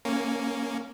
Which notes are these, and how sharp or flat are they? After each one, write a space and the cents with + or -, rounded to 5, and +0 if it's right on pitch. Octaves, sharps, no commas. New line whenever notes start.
A#3 +0 C#4 +0